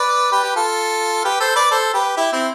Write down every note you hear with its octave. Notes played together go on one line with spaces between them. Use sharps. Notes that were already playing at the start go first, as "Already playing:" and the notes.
Already playing: B4 D5
G4 B4
G4
F4 A4
G4 B4
A4 C5
B4 D5
A4 C5
G4 B4
E4 G4
C4 E4